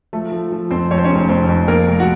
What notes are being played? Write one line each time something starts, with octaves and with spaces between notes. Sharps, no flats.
F3 A3 A4
F3
F3
F2 C4 C5
F2 C#5
C5
C#4 C#5
F1
F2 C4 C5
F2
F2 A#3 A#4
F1
F#4